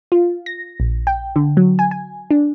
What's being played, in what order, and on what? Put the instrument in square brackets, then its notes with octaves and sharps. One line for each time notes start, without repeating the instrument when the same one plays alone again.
[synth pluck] F4
A#6
A#1
G5
D3
F#3
G#5
G#5
D4